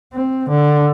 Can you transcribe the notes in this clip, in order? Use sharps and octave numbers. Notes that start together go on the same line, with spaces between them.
C4
D3